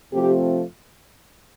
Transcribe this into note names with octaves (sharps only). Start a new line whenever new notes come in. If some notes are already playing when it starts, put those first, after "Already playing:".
C3 F3 A3 C4 G4